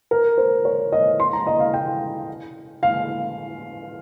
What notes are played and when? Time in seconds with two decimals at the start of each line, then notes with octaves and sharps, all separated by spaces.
0.11 A#4
0.38 C5
0.65 C#5
0.92 D#5
1.20 C6
1.33 A#5
1.47 D#5
1.60 F5
1.74 G5
2.83 F5